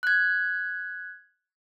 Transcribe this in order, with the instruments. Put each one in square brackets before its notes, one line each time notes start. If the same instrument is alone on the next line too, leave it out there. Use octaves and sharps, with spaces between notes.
[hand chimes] F#6 G#6